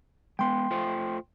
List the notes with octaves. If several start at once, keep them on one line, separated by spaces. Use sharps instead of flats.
G#3 B3 G5 C6
A3 F4 C5